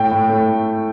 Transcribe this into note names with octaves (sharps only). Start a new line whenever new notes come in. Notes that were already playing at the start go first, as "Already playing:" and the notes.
Already playing: A2 G5
A2
A3